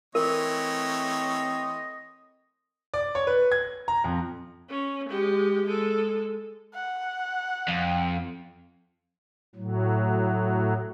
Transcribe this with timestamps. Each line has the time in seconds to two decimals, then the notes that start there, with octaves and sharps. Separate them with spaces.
0.15 E3 A3 C4 A#4 C#5 D#5
2.94 D5
3.15 C#5
3.27 B4
3.52 G#6
3.88 A#5
4.04 F2
4.70 C#4
5.09 G#3 G4
5.66 G#3 A4
6.75 F#5
7.68 F2
9.55 A2 F#3